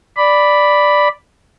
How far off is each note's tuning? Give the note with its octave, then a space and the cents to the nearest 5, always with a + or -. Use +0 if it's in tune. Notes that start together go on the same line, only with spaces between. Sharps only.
D5 +0 B5 +0